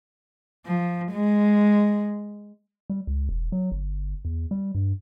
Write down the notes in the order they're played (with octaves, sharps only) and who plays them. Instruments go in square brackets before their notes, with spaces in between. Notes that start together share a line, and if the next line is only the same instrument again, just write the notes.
[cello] F3
G#3
[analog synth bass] G3
C#2
E1
F#3
G1
E2
G3
G2